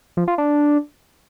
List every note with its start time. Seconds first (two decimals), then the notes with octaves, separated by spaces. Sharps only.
0.17 F3
0.28 F4
0.38 D4